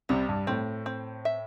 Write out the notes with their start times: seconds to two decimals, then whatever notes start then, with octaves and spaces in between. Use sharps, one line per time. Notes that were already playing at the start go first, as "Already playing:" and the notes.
0.09 C2 C3 G3
0.29 G2
0.47 A2 C4
0.86 C4
1.25 E5